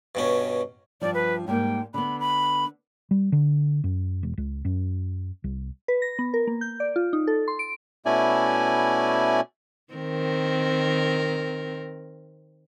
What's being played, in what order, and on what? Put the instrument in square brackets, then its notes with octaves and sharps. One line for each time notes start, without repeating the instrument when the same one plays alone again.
[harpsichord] G2 B2 C#4
[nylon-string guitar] G2 F3 [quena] D5
[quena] B4
[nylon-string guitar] G#2 G3 A#3 [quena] G5
[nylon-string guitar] D3 B3 [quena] B5
[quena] B5
[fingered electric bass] G3
D3
F#2
E1
C#2
F#2
C2
[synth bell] B4
A#6
B3
A#4
A#3
G6
D5
F4
D#4
A4
C6
D7
[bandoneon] B2 A3 C#4 E4 D5 G#5
[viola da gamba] D#3 C4 A#4